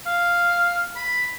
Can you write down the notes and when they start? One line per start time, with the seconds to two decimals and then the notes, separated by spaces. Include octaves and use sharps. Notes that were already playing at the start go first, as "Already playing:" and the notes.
0.07 F5
0.96 B5